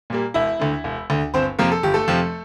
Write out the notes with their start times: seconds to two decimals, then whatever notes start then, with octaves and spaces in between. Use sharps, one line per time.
0.10 A#2 G3 A#3
0.34 E1 E4 E5
0.60 D2 D3
0.84 E1
1.10 D2 D3
1.34 G1 C4 C5
1.59 F2 C3 F3 A#3 A#4
1.72 A4
1.83 G1 G4
1.94 A3 A4
2.08 F2 C3 F3